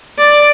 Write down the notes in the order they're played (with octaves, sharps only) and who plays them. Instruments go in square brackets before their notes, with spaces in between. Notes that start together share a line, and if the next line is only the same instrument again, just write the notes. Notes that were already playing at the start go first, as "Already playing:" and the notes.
[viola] D5